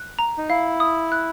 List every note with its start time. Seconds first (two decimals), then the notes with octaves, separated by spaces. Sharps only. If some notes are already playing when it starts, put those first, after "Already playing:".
Already playing: F#6
0.19 A#5
0.38 D#4
0.49 E4 F5
0.80 D#6
1.12 F#6